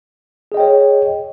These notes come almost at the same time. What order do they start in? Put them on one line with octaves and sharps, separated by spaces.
G#4 D#5 G5 C#5